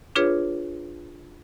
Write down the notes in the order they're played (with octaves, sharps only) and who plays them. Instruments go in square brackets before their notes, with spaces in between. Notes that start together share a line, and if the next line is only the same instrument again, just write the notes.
[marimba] D4 F4 G#4 B4 C#5